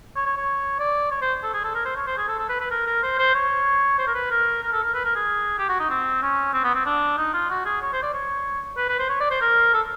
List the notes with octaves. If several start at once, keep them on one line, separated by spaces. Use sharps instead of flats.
C#5
C#5
C#5
D5
C#5
C5
A4
G#4
A4
A#4
C5
C#5
C5
G#4
A4
A4
B4
B4
A#4
A#4
C5
C5
C#5
C5
A#4
B4
A#4
A#4
A4
A#4
B4
A#4
G#4
G4
F#4
D#4
C4
C#4
C4
B3
C4
D4
D#4
F4
F#4
G#4
C#5
C5
D5
C#5
B4
B4
C5
C#5
D5
C5
A#4
A4